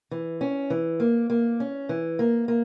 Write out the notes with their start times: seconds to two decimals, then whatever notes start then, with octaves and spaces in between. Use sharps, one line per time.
0.11 E3
0.41 C#4
0.70 E3
1.00 A#3
1.30 A#3
1.60 C#4
1.89 E3
2.19 A#3
2.48 A#3